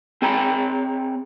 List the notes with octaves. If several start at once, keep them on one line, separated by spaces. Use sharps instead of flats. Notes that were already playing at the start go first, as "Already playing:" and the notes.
C4 G#4 G#5 A#5 B5